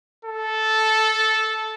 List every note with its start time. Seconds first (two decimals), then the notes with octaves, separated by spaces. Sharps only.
0.25 A4